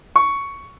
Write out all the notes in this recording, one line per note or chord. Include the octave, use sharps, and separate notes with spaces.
C#6